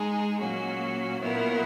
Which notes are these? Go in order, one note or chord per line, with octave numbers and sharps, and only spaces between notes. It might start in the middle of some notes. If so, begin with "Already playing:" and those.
Already playing: G#3 D#4 G#4
A#2 F#3 A#3 C#4 F#4
A#2 F#3 B3 E4 A#4